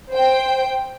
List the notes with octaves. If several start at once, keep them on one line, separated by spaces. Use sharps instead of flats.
C5 G5